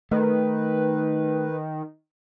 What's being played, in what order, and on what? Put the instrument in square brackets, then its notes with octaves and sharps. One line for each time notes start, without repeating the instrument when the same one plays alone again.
[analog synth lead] D#3 [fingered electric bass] A3 [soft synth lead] B4